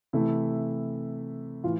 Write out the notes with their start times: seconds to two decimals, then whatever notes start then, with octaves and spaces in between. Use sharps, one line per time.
0.13 C3 E3 A3 E4
1.64 A2 E3 F4